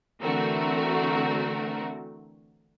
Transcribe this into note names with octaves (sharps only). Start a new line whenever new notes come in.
D3 E3 A3 C4 F#4 A#4